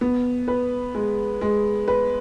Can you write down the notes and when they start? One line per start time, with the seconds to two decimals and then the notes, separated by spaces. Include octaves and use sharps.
0.01 B3
0.48 B4
0.95 G#3
1.41 G#3
1.88 B4